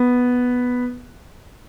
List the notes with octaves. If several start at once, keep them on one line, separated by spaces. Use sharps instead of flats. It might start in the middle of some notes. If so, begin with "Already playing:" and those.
Already playing: B3